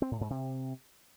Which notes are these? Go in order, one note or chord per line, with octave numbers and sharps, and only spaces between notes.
C4
A2
G#2
C3